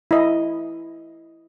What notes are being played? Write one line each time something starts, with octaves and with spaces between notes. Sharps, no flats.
E4 D#5